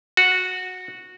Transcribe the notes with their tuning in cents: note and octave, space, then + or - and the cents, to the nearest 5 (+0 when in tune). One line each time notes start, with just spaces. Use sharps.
F#4 -10